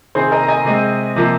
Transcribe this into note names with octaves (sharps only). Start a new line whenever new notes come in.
C3 D#3 C4 G#4 C5
A#4 D#5
A#5
D#5 G#5
C3 G#3 C4
C3 F3 A#3